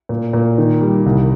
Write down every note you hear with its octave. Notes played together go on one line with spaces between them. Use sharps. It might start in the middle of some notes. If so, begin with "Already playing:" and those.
A#2
A#2
D#3
G3
C2